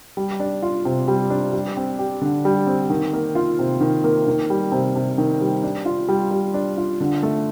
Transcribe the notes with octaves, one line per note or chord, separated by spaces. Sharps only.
G3
D4
F4
C3
G3
D4
G3
C4
G4
D3
G3
C4
D#3
A#3
F4
C3
D#3
A#3
D#3
G3
C3
C3
D#3
G3
D4
F4
G3
G3
D4
F4
D3
A3